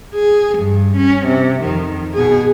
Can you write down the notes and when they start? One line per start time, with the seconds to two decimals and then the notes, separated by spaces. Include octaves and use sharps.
0.15 G#4
0.59 G2
0.97 C#4
1.27 C3
1.63 F2 D#3
2.14 B2 G#4